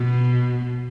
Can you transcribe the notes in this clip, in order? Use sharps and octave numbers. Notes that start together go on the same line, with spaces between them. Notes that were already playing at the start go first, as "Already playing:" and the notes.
Already playing: B2